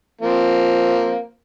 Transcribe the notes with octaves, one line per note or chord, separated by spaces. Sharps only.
F3 A#3 C4